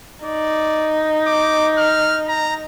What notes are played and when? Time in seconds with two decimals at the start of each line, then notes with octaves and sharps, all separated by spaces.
0.25 D#4 D5
1.27 D6
1.78 F6
2.28 A#5